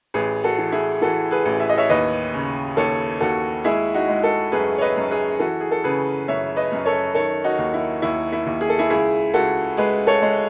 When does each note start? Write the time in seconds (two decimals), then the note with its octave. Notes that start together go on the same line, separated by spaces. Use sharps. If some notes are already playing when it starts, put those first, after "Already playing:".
0.14 A1 G#4 B4
0.44 F#4 A4
0.58 E3
0.72 E4 G#4
1.01 E3 F#4 A4
1.31 G#4 B4
1.45 A1
1.60 E5
1.69 D#5
1.78 C#5 E5
1.89 D#2 B4 D#5
2.34 C#3
2.77 D#2 A4 C#5
3.20 D#2 F#4 A4
3.64 G#3 E4 G#4
3.94 D#4 F#4
4.09 G#3
4.23 F#4 A4
4.52 F#2 G#4 B4
4.78 C#5
4.81 B4 D#5
4.96 F#2
5.10 G#4 B4
5.39 E3 F#4 A4
5.60 G#4
5.71 A4
5.84 C#3 G#4 B4
6.28 F#2 C#5 E5
6.56 B4 D#5
6.72 F#2
6.85 A4 C#5
7.15 D#3 A4 C#5
7.44 D#4 F#4
7.58 D#2
7.74 E4
8.02 D#2 E4
8.33 E4
8.46 D#2
8.61 G#4
8.69 A4
8.78 E4 G#4
8.90 C#2 E4 G#4
9.34 C#2 F#4 A4
9.77 G#3 G#4 B4
10.07 A4 C#5
10.22 G#3